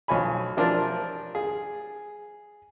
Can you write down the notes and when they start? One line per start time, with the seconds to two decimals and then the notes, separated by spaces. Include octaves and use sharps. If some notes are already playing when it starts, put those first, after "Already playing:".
0.08 B1 F3 C#5 G#5 B5
0.57 E3 F3 D4 F4 A#4 C5
1.35 G#4